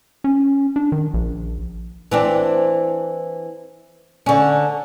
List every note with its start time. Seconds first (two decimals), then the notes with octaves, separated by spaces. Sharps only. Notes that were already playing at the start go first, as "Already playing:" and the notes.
0.24 C#4
0.76 D4
0.92 D#3
1.14 A#1
2.12 E3 C4 D4
4.26 D3 C#4